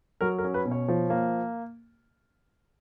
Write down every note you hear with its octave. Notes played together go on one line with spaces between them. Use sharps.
F#3 A#4
A#4
C#4
B4
B2
C#5
F3
A#3